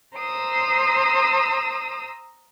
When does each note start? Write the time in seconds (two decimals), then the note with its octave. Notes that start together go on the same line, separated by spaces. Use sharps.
0.16 C5 A#5 D#6 E6